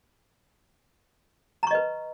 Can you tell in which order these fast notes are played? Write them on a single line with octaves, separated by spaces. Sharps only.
A#5 C#6 D#5 B4